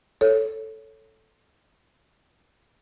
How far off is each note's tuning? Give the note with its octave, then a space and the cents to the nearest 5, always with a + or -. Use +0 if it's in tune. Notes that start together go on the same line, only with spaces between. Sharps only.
A4 +0 C#5 +0